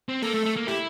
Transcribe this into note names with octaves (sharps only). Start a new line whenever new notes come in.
C4
A#3 A4
A3
A3
A#3
E4 G4